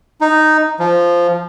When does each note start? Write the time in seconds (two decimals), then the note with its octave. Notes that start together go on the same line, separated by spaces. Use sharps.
0.21 D#4
0.79 F3